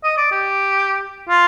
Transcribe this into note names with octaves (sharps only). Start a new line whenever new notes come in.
D#5
D5
G4
F4